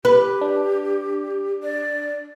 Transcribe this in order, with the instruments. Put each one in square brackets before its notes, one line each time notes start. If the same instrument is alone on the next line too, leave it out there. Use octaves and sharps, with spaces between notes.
[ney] G4 [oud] B4
[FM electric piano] D4
[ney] D5